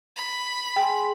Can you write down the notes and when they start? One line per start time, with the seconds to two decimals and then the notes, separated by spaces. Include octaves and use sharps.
0.16 B5
0.76 G#4 G5 G#5 C6